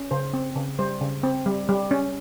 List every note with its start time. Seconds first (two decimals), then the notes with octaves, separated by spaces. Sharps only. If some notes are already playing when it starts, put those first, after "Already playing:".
Already playing: C#4
0.11 C#3 C5
0.33 C4
0.56 C#3
0.79 G3 C5
1.01 C#3
1.23 C4
1.46 G3
1.69 G3
1.91 C#4